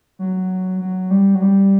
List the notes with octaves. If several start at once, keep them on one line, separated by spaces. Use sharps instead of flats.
F#3
F#3
G3
F#3
G3